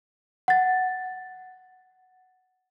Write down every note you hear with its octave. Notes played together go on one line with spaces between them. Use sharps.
F#5 A6